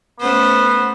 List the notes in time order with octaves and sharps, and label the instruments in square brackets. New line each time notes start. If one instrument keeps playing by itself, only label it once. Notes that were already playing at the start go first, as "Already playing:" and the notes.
[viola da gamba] A3 C#4 C5 [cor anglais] B3